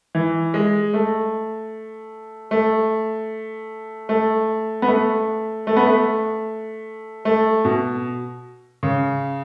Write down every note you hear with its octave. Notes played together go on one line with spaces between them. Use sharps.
E3
G#3
A3
A3
A3
B3
A3
A3
B3
A3
A3
B2
C#3